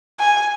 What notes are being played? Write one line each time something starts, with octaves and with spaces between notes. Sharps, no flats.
G#5